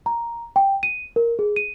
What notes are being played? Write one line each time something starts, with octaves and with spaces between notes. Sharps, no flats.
A#5
G5
D#7
A#4
G#4
D#7